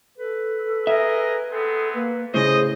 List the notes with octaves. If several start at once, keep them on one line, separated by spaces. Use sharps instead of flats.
A4 B4
G#4 A#4 D#5 E5
B3 C4 G#4 A4
A#3 B4
A2 C#3 G#4 C5 D#5